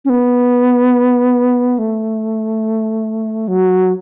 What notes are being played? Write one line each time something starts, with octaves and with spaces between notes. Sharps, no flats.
C#4
B3
A3
F#3